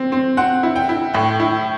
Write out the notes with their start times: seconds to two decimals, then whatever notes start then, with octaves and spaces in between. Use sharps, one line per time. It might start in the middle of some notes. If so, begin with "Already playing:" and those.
Already playing: C4
0.12 C4
0.37 C4 F#5
0.63 E4
0.76 G5
0.89 E4
1.14 A2 G5
1.40 E4